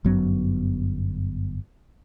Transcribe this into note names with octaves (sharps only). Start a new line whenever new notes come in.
G1 F#2 F#3 B3